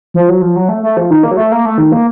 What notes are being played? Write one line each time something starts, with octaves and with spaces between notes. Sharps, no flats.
F3
F#3
F3
F#3
A3
A3
F3
D#3
A#3
F#3
A3
A#3
A3
D#3
A#3